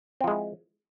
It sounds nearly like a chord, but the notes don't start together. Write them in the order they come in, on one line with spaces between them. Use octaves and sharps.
C4 F3 G#3 E4